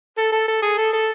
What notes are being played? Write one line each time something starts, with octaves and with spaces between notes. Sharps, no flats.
A4
A4
A4
G#4
A4
A4